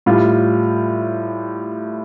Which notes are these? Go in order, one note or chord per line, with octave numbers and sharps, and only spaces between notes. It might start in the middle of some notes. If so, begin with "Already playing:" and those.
A2 G3 F4